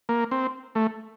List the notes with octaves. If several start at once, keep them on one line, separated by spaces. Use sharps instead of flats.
A#3
C4
A3